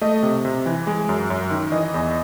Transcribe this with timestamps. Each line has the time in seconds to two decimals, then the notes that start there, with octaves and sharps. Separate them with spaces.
0.01 A3 D#5
0.23 C3
0.45 C3
0.66 E3
0.87 G#3
1.09 F#2
1.30 F#2
1.50 D#3
1.72 E3 D#5
1.94 E2